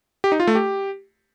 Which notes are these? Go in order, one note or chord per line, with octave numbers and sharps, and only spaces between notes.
G4
D#4
F4
A3
G4